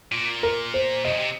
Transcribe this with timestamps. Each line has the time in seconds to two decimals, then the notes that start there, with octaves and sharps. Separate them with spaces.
0.12 A#2
0.43 A#4
0.74 C5
1.05 C3 D#5
1.12 A#2
1.19 C3